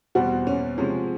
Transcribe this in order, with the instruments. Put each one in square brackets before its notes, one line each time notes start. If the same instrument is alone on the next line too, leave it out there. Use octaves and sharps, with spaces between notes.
[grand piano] E2 B2 G3 C4 [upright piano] F#4
[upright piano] C#4
[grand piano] C3 F3 G#3 [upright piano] C#4